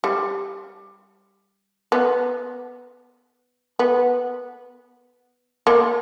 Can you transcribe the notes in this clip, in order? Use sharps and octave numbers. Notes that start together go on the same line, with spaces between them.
G3
B3
B3
A#3